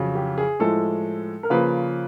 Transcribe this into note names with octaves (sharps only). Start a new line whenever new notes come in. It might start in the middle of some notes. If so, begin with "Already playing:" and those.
Already playing: F2 C#3 F#3
G4
G#4
A2 F3 G#3 A4
A#4
C#3 F3 A#3 B4